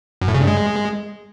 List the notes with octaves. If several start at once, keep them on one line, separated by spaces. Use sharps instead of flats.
F#2
A2
C#3
G2
G#3